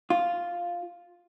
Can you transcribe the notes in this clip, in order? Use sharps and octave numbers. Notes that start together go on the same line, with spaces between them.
F4